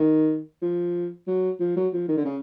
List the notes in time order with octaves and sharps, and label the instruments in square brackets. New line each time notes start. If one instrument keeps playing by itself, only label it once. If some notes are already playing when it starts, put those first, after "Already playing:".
Already playing: [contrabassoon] D#3
F3
F#3
F3
F#3
F3
D#3
D3
C#3